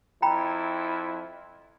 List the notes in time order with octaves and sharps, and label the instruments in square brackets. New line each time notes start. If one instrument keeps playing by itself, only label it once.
[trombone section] F2 E4 [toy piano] G5 A#5 B5